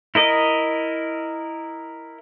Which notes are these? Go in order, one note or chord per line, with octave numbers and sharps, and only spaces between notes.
E4 A#4 D#5